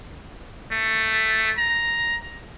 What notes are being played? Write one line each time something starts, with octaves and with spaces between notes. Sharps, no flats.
A3
A#5